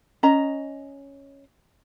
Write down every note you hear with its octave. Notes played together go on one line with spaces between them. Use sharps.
C#4 D#5 A#5